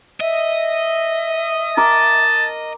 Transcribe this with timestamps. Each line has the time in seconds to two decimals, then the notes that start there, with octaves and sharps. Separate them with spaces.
0.21 D#5 E5
1.77 A#4 A5 A#5 D6